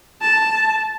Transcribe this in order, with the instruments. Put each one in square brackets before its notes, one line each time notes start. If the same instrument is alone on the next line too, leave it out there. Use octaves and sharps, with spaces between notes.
[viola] A5